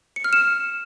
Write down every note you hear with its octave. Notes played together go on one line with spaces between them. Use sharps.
C#7
F6
E7